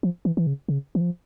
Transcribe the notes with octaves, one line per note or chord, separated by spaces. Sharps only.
F3
E3
E3
C#3
C#3
E3
F3